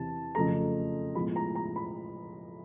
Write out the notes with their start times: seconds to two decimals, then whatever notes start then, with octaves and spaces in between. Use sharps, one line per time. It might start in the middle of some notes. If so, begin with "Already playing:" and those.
Already playing: E2 C3 E3 A5
0.35 F2 C#3 F#3 A3 A#5
1.15 A2 F3 G#3 B3 B5
1.36 A#5
1.55 A#5
1.76 B5